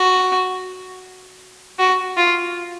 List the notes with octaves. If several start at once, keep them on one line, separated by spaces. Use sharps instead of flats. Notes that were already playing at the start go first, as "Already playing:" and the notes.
Already playing: F#4
F#4
F4